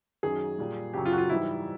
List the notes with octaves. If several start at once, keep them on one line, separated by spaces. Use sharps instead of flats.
F#2 D#3 F#3 G#4
A#2 G3
F#2 C#3 F#3 G4
F4
F#4
F4
G#2 E3 G3 E4